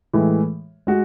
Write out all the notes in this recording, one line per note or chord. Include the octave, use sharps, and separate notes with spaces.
A2 E3 G#3
G#3 F#4